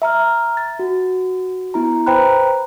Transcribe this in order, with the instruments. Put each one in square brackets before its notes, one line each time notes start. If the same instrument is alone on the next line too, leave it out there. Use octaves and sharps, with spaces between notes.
[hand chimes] E5 A#5 F6
A6
F#4
B3 E4 A#5
B4 C5 G5 A#5 B5 F#6